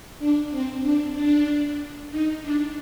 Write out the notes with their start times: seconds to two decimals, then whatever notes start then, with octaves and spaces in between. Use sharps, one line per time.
0.19 D4
0.51 C4
0.83 D4
1.14 D4
2.10 D#4
2.42 D4